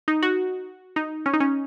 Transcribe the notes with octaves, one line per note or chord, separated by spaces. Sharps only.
D#4
F#4
D#4
C#4
D#4
C#4